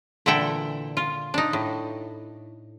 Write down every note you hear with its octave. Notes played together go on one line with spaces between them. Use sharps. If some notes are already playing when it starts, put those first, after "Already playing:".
A#2 D3 E3 E4 A4 G5
F4
D4 D#4
A2